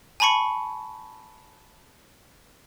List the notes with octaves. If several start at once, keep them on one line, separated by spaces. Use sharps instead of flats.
G#5 A5 B5 C#6 C#7